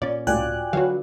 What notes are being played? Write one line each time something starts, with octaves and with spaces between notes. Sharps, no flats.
A#2 C#4 D5
C#2 A2 F4 F#4 D5 G5 G#5 F#6
D3 F#3 F#4 B4 C#5 F5